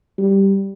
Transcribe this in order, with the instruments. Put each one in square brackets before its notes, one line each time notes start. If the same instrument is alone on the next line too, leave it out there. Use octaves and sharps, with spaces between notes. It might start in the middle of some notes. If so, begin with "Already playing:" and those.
[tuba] G3